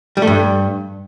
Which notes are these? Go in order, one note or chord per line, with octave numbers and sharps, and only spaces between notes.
G3
A3
G2